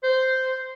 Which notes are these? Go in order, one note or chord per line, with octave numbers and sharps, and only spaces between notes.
C5